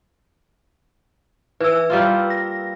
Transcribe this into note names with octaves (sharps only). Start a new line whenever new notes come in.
E3 B4 E6
G3 A#3 F4
A#6